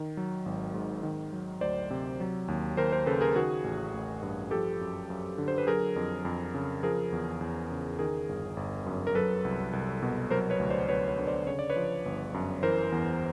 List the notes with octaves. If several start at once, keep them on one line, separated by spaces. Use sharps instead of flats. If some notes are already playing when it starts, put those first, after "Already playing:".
Already playing: D#3
F#3
G#1
G#2
D#3
F#3
D2 C5 D5
C3
F#3
D#2
D#2 A#4 C5
A#4 C5
C#3 A4 B4
G#4 A#4
D#3 F#4 G#4
A1
A1
G2
F3 G4 A4
F#2
F#2
D3
C5
B4
F#3 G#4 A#4
F2
F2
C#3
F3 G#4 A#4
E2
E2
C#3
D#3 G#4 A#4
G1
G1
F#2
A#4
F#3 A4 B4
C2
C2
B2
F#3 A#4 C5
B4 C#5
D2
C5 D5
D2 B4 C#5
B4 C#5
D3
C5 D5
C#3 C#5
D5
B4 C#5
F3
G1
F#2
E3 A#4 C5
E2